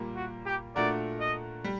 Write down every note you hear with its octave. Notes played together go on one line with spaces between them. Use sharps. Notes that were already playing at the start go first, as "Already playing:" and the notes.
Already playing: A#2 G3 A#3
F#4
G4
A#2 A3 D4 F#4 A#4 D5
D#5
G3